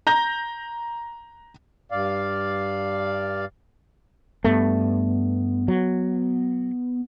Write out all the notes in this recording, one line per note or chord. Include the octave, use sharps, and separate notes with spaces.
A#5 G6 A#6
G2 D5 F5
G2 A3 B3
F#3